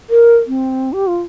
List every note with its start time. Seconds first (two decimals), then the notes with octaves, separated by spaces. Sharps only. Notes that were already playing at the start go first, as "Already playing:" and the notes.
0.10 A#4
0.47 C4
0.93 G4
1.07 F4